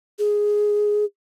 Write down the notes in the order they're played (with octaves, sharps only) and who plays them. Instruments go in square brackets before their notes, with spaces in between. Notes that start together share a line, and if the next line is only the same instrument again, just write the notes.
[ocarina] G#4